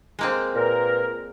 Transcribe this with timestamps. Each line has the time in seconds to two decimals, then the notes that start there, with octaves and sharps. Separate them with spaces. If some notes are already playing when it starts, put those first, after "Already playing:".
0.19 G#3 A#3 C4
0.55 A#2 A#4 B4